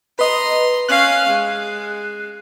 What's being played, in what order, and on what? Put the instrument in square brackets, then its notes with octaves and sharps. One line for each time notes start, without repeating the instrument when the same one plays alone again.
[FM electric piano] B4 D#5 [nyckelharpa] A#5 C6
[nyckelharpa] C#4 F5 [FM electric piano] F#6 C7
[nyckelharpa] G#3